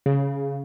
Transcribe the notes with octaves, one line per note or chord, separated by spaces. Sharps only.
C#3